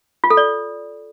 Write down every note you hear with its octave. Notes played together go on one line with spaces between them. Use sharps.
F4
A4
D5